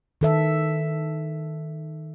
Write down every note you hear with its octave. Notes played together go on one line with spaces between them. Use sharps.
D#3 A4 E5